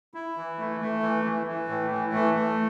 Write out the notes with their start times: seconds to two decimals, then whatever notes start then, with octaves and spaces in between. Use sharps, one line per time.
0.14 E4
0.37 E3
0.58 A3
0.81 A3
1.03 E3
1.25 E3
1.47 E3
1.68 A2
1.91 E3
2.13 A3
2.34 A3